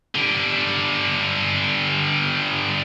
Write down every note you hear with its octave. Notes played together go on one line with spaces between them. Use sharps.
D3 G3